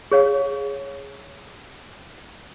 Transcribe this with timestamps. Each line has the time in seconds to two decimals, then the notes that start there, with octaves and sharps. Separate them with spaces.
0.11 G#4 C#5 F5